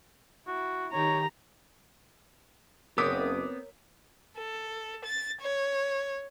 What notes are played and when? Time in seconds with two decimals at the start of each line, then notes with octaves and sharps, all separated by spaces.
0.47 E4 F#4
0.93 D#3 D#4 G4 C#5 A#5
2.98 F#1 B3 C4 A#4 C#5 D6 D#6 B6
4.37 A4
5.05 A6
5.41 C#5